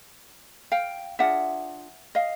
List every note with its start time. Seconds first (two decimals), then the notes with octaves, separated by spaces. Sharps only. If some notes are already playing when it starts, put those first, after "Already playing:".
0.72 F5 G5
1.19 D4 F4 G#4 E5 F#5
2.15 D#5 F5